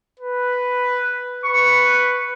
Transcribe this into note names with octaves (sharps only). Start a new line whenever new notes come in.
B4
B4 C#6